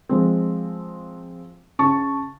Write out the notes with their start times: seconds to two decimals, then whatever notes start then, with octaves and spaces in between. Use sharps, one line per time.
0.09 F3 G#3 C4
1.79 C#3 A5 C#6